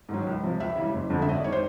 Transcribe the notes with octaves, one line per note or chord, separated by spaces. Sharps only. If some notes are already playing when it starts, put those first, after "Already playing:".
G#2 D#3 F#3
C#2
C3 F3
C#2 E5
C#3 E3 G3
F#1
F2 D3
E5
G#1 D#5
D5
D#3 G3 C#5
C5